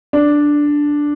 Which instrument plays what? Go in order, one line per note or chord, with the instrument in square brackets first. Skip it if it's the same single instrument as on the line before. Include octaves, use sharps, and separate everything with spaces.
[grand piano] D4